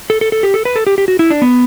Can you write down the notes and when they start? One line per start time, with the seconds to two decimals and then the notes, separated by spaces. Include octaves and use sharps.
0.10 A4
0.21 A4
0.32 A4
0.43 G4
0.54 A4
0.65 B4
0.76 A4
0.87 G4
0.98 G4
1.08 F#4
1.19 E4
1.30 D4
1.42 B3